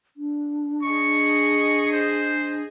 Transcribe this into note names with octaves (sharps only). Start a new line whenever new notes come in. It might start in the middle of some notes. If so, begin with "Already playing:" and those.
D4
G#4 D#5 C#6
C5